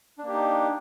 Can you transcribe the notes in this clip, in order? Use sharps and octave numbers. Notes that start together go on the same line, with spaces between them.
A#3 D4 D#4 G4